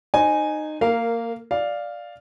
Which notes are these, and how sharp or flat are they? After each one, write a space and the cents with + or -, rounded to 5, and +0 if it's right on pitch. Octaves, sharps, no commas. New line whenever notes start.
D#4 -20 C5 +20 G#5 +0
A#3 -15 A#4 +0 F5 -10
D5 +0 F5 +0